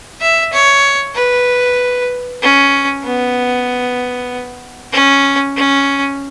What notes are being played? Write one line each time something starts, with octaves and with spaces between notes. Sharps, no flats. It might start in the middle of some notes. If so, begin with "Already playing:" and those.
E5
C#5
B4
C#4
B3
C#4
C#4